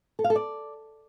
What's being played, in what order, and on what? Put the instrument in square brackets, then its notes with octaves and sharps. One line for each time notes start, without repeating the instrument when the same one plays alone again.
[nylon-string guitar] A4
F5
A4
D5